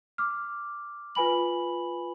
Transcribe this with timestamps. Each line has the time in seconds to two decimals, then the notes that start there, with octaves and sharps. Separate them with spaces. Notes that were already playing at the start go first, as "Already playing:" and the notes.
0.18 D6 F6
1.15 F4 B4 G#5 B5 F#7